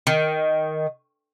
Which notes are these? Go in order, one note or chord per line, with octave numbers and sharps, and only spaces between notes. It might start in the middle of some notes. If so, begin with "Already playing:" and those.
D#3